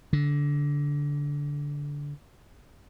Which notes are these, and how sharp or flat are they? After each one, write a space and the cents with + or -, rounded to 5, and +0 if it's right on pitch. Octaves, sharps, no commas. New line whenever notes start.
D3 -20